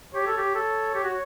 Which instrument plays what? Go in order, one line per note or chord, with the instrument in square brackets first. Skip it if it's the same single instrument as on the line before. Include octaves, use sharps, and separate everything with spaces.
[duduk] G4 [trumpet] C#5
[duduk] A4
G4
A4
G4
F#4